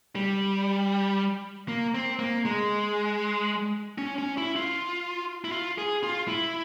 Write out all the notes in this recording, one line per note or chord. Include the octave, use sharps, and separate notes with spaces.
G3
A#3
C4
A#3
G#3
C#4
C#4
E4
F4
E4
F4
G#4
F4
E4